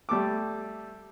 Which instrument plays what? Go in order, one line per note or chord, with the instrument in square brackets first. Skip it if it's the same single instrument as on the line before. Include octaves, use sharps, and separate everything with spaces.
[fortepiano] G3 A3 A4 D6